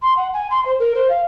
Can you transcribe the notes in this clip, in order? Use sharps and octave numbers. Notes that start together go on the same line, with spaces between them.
C6
F#5
G#5
C6
C5
A#4
C5
F5